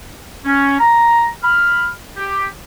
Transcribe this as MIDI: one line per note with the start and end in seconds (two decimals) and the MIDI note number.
0.45 0.77 61
0.80 1.28 82
1.42 1.88 83
1.42 1.88 89
2.16 2.46 67